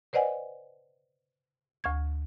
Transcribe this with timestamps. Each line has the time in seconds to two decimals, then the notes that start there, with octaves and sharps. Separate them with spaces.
0.13 B4 C5 D5 D#5 F#5 G#5
1.84 D2 C#6 G#6